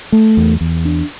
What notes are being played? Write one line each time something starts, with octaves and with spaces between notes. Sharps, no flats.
A3
E2
E2
D4